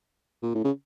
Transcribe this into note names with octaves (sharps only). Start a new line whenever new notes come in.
A#2
A2
C#3